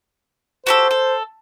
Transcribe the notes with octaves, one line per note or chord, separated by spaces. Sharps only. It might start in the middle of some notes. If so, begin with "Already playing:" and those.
F#4 G4 A4 C5
A4